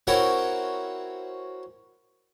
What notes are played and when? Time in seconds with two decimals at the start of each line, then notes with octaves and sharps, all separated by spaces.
0.07 C4 C#4 E4 F#4 A#4 C#5